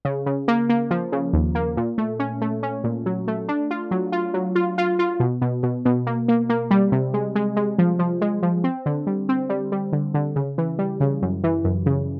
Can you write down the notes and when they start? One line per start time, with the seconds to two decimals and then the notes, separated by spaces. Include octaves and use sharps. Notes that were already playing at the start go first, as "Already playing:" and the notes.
0.05 C#3
0.26 C#3
0.48 A#3
0.69 A#3
0.91 F3
1.12 C#3
1.33 D#2
1.55 A#3
1.77 A#2
1.98 A3
2.19 C#4
2.41 A3
2.63 C#4
2.84 A#2
3.06 F#3
3.28 A3
3.48 D4
3.71 F4
3.91 F#3
4.12 F4
4.34 F#3
4.55 F4
4.78 F4
4.99 F4
5.20 B2
5.41 B2
5.63 B2
5.85 B2
6.07 A#3
6.28 A#3
6.49 A#3
6.71 G3
6.92 C3
7.14 G#3
7.35 G#3
7.56 G#3
7.78 F3
7.99 F3
8.21 G#3
8.42 F3
8.64 C4
8.86 D3
9.07 G3
9.29 C4
9.49 G3
9.72 G3
9.93 D3
10.14 D3
10.36 C#3
10.58 E3
10.79 G3
11.00 C#3
11.22 F#2
11.44 E3
11.64 F#2
11.86 C#3